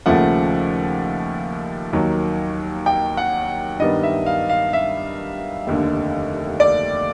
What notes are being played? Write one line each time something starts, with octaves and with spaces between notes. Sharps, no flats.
D#2 C#3 F3 A3 F#5
D#2 D#3 F#3
G5
F#5
G2 D#3 G3 B3 D#5
E5
F5
F5
E5
F1 D#2 D3
D5